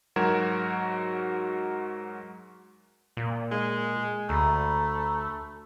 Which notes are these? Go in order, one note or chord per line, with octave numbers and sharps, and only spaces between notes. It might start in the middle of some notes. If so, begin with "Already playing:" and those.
G#2 F#3 F#4 A#4 G#6 E7
A#2
G#3
D2 A3 A#5 B5